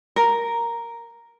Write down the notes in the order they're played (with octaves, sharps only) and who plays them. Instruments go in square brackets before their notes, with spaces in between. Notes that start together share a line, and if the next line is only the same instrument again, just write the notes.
[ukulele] A#4